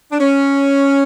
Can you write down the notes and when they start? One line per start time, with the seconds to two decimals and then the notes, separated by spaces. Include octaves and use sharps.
0.12 D4
0.20 C#4